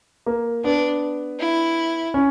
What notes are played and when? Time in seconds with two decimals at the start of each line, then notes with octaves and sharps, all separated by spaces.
0.26 A#3
0.64 B3 D4
1.39 E4
2.14 C#4